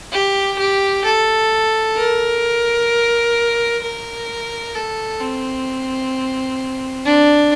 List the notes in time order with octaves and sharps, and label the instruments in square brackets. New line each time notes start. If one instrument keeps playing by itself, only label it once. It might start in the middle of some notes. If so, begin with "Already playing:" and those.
[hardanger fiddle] G4
G4
A4
A#4
A#4
A4
C4
D4